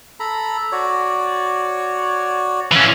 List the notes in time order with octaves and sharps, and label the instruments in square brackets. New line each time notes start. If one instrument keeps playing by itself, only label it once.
[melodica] A4 A#5 B5
F#4 C#5 D5
[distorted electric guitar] E3 C#4 [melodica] F5